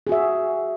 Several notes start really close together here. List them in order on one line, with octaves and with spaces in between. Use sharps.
G#4 F#4 E5